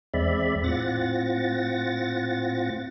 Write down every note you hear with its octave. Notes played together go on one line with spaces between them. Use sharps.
E2 G#3 C4 D5 E5 B5
A2 C4 F4 F#5 A6 A#6